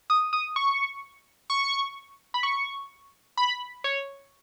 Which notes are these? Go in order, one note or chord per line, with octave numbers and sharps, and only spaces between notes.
D#6
D#6
C#6
C#6
B5
C#6
B5
C#5